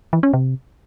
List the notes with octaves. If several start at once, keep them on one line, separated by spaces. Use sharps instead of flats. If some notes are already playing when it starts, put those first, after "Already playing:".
E3
C#4
C3